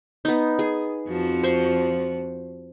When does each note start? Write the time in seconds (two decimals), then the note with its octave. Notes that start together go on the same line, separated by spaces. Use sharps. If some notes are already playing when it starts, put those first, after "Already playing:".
0.25 B3 D#4
0.59 G#4
1.08 F2 F3 F#4
1.43 C5 C#6